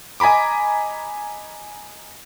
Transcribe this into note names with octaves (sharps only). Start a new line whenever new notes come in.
D#5 G#5 A#5 B5 D6